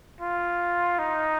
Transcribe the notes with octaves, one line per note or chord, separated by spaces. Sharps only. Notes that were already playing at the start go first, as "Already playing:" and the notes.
F4
D#4